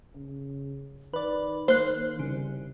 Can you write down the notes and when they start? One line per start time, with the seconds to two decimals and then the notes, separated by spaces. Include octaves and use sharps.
0.15 C#3
1.13 D#3 B4 D5
1.68 A#3 C5 F#6
2.19 C2 C#3